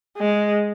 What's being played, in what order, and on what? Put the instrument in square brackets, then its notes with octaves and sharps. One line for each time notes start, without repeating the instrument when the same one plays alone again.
[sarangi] G#3